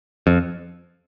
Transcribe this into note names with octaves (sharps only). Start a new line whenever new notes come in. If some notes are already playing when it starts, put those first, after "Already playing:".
F2